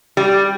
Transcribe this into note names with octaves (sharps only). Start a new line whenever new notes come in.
G3